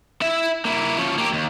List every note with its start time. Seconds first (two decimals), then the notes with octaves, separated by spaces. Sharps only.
0.22 E4 E5
0.65 A#3 E4
0.98 F3 C#4
1.18 A#3 G4
1.33 D#2